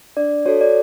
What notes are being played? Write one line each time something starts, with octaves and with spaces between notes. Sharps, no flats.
D4 D5
F#4 A4 C#5
D5